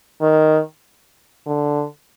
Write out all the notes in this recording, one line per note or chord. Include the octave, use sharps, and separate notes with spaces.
D#3
D3